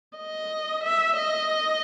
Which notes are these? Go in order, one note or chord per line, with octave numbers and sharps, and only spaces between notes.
D#5
E5
D#5